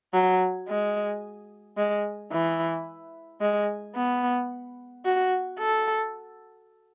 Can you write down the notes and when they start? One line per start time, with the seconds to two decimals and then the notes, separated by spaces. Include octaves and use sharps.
0.14 F#3
0.69 G#3
1.77 G#3
2.32 E3
3.41 G#3
3.96 B3
5.05 F#4
5.59 A4